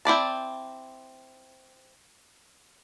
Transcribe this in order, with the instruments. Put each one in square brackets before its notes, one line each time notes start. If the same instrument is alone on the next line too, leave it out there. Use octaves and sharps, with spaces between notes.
[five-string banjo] C4 E4 D5 A5